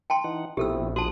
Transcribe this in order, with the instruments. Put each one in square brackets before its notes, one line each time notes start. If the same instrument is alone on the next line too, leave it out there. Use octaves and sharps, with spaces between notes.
[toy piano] G5 A5 C6
[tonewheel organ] E3 D#4 F#5
[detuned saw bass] A#1 [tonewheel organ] B2 C4 E4 [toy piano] G4 A4 E6
[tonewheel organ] F3 D#6 F#6 [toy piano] F#4 A5